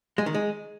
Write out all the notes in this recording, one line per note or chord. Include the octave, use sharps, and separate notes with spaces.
G#3
D#3
G#3